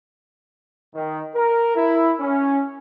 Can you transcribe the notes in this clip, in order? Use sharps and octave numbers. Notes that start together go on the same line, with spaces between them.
D#3
A#4
E4
C#4